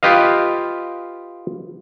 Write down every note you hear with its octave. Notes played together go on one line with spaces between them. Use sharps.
F4 G4 B4 D#5 F5